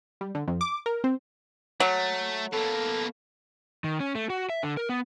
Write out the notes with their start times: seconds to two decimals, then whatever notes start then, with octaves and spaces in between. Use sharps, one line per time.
0.21 G3
0.35 D3
0.48 F2
0.61 D6
0.86 A#4
1.04 C4
1.80 F#3 A3
2.53 B2 A#3 A4
3.84 D#3
4.00 C#4
4.15 A3
4.30 F#4
4.50 E5
4.63 D3
4.77 A#4
4.89 B3